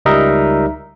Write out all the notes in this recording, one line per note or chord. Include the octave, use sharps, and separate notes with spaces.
C#2 G3 D#4 A#4 D#5 E5